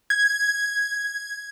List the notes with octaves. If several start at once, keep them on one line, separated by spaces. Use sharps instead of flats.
G#6